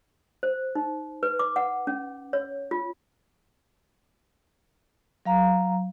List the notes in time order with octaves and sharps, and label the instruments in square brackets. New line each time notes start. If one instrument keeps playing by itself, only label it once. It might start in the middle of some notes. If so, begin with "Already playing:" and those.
[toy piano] C5
D#4
B4
D6
F#5
C#4
C#5
F4
[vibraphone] F#3 F5 A#5